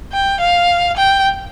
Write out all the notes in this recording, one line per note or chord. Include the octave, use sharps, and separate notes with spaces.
G5
F5
G5